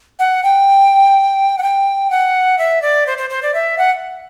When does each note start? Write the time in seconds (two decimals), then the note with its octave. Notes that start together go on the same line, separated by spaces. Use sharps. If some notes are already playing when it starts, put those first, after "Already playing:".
0.19 F#5
0.43 G5
1.58 F#5
1.63 G5
2.11 F#5
2.58 E5
2.82 D5
3.07 C5
3.18 C5
3.30 C5
3.43 D5
3.54 E5
3.78 F#5